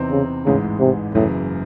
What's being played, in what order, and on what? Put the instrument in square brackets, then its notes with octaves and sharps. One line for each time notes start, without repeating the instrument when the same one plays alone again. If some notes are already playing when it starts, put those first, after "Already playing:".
Already playing: [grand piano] E2 C3 E3 C4 D#4
[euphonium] C#3
[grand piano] A1 G#2 E3 G#3 [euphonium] C#3
[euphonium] C3
[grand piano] F#1 F#2 C#3 E3 [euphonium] A2